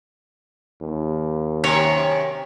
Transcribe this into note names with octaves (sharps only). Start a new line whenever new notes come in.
D#2
F#2 C3 D#3 C#5